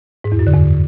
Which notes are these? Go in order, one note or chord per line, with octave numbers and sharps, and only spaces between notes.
G#2
E2
F#2
D3
E2